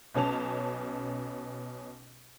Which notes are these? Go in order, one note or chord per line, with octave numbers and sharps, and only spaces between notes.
B1 B2 C#4 A5 F7